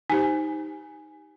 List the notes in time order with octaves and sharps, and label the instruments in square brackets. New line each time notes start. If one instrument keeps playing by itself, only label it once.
[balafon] D#4 G4 C5 [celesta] G#5